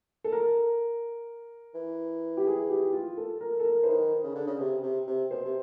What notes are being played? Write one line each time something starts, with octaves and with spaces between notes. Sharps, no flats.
A4
A#4
E3
G4
G#4
G4
F4
A4
A#4
A4
A#4
E3 C5
D#3 B4
C#3
D3
C#3
C3
C3
C3
B2 C5
C3